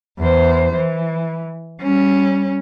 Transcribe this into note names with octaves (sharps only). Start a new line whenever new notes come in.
E2 C5
E3
G3 C#4